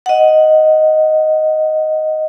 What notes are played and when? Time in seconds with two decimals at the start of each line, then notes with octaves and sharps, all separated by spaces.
0.06 D#5 F#5